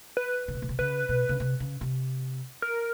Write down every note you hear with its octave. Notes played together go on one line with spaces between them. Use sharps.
B4
C#3
C3
B2
C3
C#3 B4
B2
C#3
C3
C#3
C3
A#4